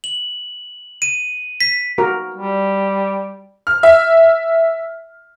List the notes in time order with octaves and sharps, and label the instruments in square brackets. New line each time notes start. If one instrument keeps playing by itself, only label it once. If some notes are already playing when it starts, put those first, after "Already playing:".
[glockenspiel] F#7
D#7
B6
[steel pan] F#4 A#4
[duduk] G3
[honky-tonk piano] F6
E5